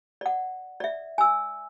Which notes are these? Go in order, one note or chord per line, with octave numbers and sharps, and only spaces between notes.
D5 F#5
D5 E5
G#5 E6